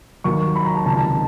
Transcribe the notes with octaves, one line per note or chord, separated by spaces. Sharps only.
D#2 D#3 F#3 A#3 C#6
B5
A#5
A5
C#2 C3 D#3 A5
A5